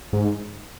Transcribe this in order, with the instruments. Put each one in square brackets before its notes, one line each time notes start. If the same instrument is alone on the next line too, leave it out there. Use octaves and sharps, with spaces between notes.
[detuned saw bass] G#2